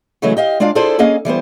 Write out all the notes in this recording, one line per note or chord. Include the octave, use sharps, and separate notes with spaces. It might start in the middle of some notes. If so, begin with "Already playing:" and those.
C#3 E3 F#3 G#3 A3
G4 D#5 F5
G#3 D4 F4 D5 F5
E4 F4 G#4 A4 C5 D5
A#3 C#4 G#4 D#5 F5
E3 G3 B3 C5